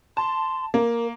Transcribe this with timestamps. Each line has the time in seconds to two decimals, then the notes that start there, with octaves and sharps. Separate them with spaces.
0.17 A5 C6
0.74 A#3 A#4